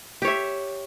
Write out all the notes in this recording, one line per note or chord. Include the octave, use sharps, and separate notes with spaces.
G4 C#5 E5